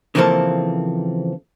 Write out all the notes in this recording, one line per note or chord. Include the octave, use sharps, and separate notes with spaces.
C#3 E3 F3 A#3 C4 A4